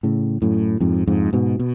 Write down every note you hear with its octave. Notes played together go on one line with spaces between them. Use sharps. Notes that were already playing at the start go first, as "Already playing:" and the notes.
A2 C#3
F#2 A2
F2 G#2
F2 G#2
G#2 B2
B2